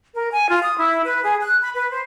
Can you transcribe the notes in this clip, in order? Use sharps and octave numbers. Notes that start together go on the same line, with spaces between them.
A#4
G#5
F4
D#6
E4
B4
G#4
F#6
B5
B4
C5